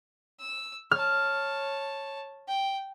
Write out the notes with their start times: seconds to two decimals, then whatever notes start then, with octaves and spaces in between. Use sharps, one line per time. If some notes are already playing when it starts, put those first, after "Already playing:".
0.39 E6
0.91 C#5 A5 F6
2.48 G5